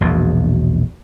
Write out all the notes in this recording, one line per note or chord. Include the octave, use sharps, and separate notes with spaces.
E1 A#1 E2 B2